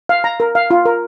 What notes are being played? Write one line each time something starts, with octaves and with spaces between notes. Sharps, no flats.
F5
A#5
A#4
F5
F4
A#4